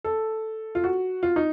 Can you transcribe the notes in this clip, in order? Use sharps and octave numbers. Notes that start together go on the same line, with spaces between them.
A4
F4
F#4
F4
D#4